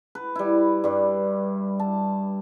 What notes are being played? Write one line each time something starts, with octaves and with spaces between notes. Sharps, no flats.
B4
G3 E4
G2 G3
A5